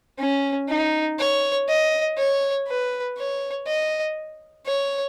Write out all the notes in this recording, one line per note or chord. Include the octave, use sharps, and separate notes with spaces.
C#4
D#4
C#5
D#5
C#5
B4
C#5
D#5
C#5